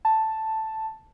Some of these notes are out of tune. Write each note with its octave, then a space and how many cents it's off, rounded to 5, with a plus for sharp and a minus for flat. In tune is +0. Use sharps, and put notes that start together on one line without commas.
A5 +0